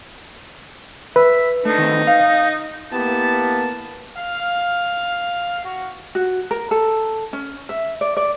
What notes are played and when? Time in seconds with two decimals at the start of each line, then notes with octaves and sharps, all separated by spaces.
1.16 B4 E5
1.65 A3 D4 D#4
1.78 D#3 A3 C4
2.07 F5
2.92 A#3 B3 E4 G4 A5
4.18 F5
5.63 F#4
6.15 F#4
6.51 A#4
6.71 A4
7.33 C#4
7.69 E5
8.01 D5
8.17 D5